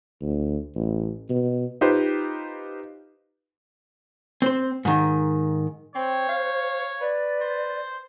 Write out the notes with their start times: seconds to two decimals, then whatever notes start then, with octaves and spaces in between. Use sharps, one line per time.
0.22 D2
0.76 A1
1.30 B2
1.81 D#4 F4 G4 B4 C5
4.42 C4 C5
4.85 G#2 D#3
5.95 C4 C5 C#5
6.29 F5
7.01 B4 D5
7.41 C5